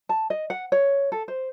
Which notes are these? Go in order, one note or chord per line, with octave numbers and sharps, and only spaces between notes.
A5
D#5
F#5
C#5
A4
C5